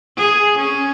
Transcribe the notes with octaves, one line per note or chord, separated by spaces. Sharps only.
G#4
C#4